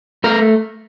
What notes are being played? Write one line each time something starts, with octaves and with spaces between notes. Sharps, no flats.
A3 A#4